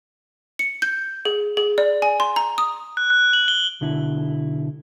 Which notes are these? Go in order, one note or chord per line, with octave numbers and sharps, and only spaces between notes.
C#7
G6
G#4
G#4
D5
G#5
C6
A#5
D#6
F#6
F#6
F#7
G7
B1 D3 E4